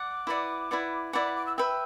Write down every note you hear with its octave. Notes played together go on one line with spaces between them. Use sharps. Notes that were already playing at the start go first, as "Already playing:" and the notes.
Already playing: D5 F#5 D6
E4 B4 D5 F#5
E4 B4 D5 F#5
E4 B4 D5 F#5 D6
B5
D6
E6
B4 E5 G5 E6